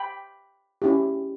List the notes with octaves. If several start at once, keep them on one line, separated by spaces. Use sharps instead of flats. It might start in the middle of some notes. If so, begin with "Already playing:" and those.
Already playing: G5 B5
C#4 E4 G4